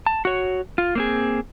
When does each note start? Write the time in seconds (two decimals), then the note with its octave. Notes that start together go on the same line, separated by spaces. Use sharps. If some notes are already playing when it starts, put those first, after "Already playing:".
0.06 A5
0.25 F#4 C#5
0.78 F4
0.95 A#3 C4 G#4